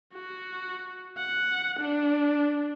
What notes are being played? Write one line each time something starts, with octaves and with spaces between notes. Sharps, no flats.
F#4
F#5
D4